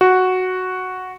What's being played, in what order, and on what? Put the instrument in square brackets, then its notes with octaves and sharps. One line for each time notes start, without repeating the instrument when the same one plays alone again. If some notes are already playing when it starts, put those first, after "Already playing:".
[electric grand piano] F#4